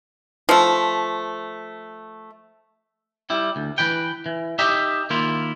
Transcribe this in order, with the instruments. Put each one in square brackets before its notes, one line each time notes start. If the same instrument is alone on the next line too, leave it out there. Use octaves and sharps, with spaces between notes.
[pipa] F3 A3
[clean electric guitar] G3 E4
D2
E3 B4 G5
E3
D#4 G4 D#5 E5
D#3 A#3 E4 F4